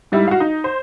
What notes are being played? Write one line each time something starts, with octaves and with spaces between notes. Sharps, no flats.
G#2 G3 E4
F#4 F5
D#4
C5